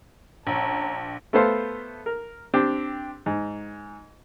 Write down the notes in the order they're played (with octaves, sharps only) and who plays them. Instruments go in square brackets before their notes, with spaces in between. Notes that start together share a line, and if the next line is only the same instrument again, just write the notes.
[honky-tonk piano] A#1 [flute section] C#4 C#5 A#5 [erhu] A5
[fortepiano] A3 B3 A4 C5 F5
A#4
C4 D4 G4
G#2